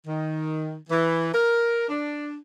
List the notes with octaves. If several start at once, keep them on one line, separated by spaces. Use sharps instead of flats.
D#3
E3
A#4
D4